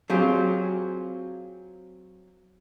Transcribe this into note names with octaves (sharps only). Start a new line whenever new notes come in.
F#3 C4 F4 G4 G#4